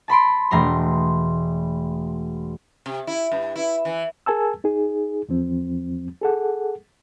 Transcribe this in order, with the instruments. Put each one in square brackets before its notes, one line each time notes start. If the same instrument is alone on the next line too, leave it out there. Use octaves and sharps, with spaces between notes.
[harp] A5 B5 C6 D7
E1 A3 A#5 C6
[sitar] C3
E4
G2
E4
E3
[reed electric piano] G#4 A#4 G#5 A5 E6
D#4 G#4
E2 F3 C4
G#4 A4 F#5